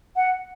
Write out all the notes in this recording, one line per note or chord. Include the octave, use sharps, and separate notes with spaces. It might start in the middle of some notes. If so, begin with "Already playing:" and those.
F#5